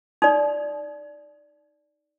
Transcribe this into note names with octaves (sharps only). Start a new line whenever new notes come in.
D#4 D5